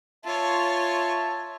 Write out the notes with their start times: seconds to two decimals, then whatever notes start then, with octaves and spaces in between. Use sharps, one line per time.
0.25 F4 C#5 E5 A5